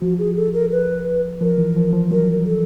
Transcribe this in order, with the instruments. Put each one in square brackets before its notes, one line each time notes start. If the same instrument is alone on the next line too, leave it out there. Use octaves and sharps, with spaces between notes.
[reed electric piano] F3 [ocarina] F#4
[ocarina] G#4
A4
A#4
B4
[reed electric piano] F3 [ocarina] A#4
[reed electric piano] E3
F3
F3
[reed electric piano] F#3 [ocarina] A#4
[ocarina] A4